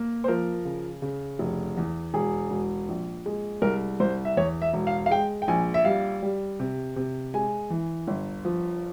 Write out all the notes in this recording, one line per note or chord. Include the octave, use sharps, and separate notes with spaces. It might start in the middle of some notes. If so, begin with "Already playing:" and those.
Already playing: A#3
C5
F3 A#4
C#3
C#3
F1
E2
E1 G#4
E1
A#1
G#3
C2 A#4
C2 C5
E5
E2 C#5
E5
E1
F5
F5
G#3 G5
G5
A#1 G#5
E5
G3 F5
G3
C3
C3
G#3 G#5
E3
G1
F3